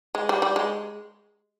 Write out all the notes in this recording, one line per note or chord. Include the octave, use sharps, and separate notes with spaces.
G#3
G3
G3
G#3